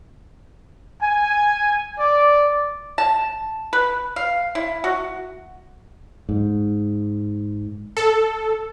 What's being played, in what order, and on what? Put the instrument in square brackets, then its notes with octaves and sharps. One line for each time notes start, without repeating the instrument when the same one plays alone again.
[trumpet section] G#5
D5
[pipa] A5
B4
F5
E4
F#4
[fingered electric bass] G#2
[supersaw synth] A4